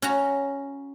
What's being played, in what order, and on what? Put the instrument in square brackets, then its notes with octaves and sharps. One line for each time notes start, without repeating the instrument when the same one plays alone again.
[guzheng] C#4 F#4 A#5